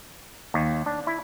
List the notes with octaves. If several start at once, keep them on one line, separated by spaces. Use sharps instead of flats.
D#2
D4
E4